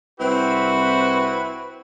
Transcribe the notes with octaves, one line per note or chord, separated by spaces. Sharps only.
C2 C4 E4 F#4 B4